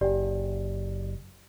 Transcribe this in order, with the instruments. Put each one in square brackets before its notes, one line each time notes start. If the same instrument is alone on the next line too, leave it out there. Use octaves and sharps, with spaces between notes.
[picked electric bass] F#1 [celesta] G4 D5